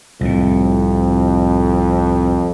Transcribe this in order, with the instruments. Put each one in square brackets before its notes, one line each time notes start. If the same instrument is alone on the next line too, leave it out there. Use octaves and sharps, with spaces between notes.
[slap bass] C2 A2 [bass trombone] F2